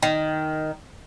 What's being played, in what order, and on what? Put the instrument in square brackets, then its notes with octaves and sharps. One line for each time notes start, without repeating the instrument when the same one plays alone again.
[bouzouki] D#3